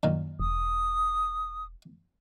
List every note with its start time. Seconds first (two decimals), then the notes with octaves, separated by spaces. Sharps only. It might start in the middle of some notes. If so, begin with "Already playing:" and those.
0.03 F#2 A#2 D#3
0.40 E1 D#6